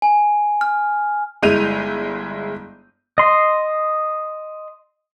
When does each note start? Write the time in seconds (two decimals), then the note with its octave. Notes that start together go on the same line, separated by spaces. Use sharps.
0.02 G#5
0.61 F6
1.43 G1 G#3 E4 G6 D#7 F7
3.18 D#5 C6